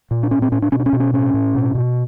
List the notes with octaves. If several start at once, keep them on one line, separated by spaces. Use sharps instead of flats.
A#2
D4
A2 C#4
C4
A2 C#4
D4
B2 C#4
D4
C#4
B2
C#4
A2 C#4
A2
B2
B2